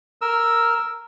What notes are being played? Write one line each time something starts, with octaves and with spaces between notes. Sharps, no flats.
A#4 E6